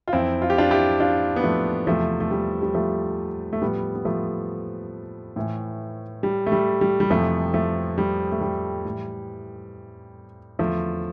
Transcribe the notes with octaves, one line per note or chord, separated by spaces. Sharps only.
F4
F2 E3 C4 E4
F4
G4
D4 F4
E4 G4
D4 F4
B3
F3 A3
E2 C3 E3 F3 A3
A3
G3
G3
F3 A3
A3
A2 F3 G3 B3
B3
F3 A3
A2 E3
G3
A3
G3
G3
G3
F2 C3 E3 F3 A3
F3 A3
G3
A3
G3
A2 E3
E2 D3 F3 A3